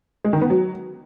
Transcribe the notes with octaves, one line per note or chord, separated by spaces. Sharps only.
G#3
D#3
B3
F#3